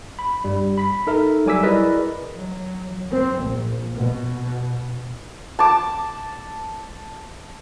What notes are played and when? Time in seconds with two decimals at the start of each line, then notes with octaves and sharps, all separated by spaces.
0.19 B5
0.44 G2 G3
0.78 B5 B6
1.07 D#4 A4 A#4 E5
1.46 F#3 G3 G#5 D6 E6 B6
1.63 E4 G#4 A#4 B4 D5 D#5
2.35 F#3
3.11 C4
3.41 A#1
3.93 B2
5.59 A5 D6